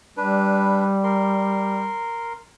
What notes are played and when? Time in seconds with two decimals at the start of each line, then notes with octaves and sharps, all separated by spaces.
0.17 G3 D4 B4
1.04 A#4 C6